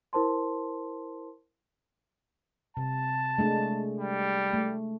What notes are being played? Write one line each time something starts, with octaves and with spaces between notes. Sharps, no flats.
E4 A#4 C5 A5 C6
C3 A5
G#3 A3 D4
G3
A3